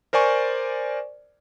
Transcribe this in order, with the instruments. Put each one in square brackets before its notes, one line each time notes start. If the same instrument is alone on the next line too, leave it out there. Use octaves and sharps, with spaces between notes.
[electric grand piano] A#4 C5 D5 G#5 C#6